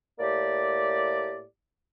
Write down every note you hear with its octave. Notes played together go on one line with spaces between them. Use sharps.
A2 A#3 G4 D5